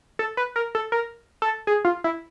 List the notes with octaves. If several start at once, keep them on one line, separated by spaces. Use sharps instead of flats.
A4
B4
A#4
A4
A#4
A4
G#4
F4
E4